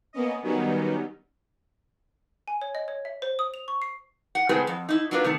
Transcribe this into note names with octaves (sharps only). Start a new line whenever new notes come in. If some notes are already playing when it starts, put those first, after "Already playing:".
A#3 B3 C#4 D#5
D#3 F#3 G3 B3 C#4 D#4
G#5
C#5
D#5
C#5
E5
C5
D#6
F7
C#6
C7
F#5
A2 C#3 G#3 C4 G#4 B4
F2
D#4 E4
F#3 A#3 D4 F4 B4
C3 D#3 A3